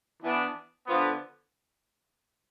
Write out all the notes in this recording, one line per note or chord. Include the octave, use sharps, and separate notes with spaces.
E3 B3 D4
D3 F3 B3